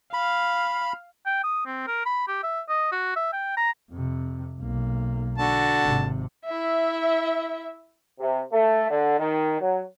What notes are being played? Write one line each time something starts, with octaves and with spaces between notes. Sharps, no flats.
F5 B5
G5
D#6
C4
A#4
B5
G4
E5
D#5
F#4
E5
G5
A#5
F2 C3
B1 A#3
D3 F#4 A5
G#1 C3
E4 E5
C3
A3
D3
D#3
F#3